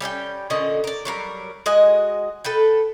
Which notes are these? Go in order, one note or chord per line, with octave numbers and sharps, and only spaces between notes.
G3 C#4 D5 G5
A#2 D3 C#4 D#5
A#4 D5
F#3 G3 A#4
G#3 F#4 D#5 G#5
A4 B4 G5